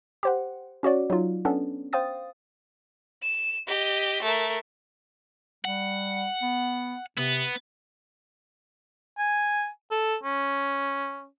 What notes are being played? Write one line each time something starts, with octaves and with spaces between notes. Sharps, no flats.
G4 C5 F#5
C#4 F#4 C#5 D5
F#3 D#4 F4
B3 C#4 D4 A4
C5 F5 G5 D#6 A6
E7
G4 D#5
A3 A#4
G3 F#5
B3
C3 B3
G#5
A4
C#4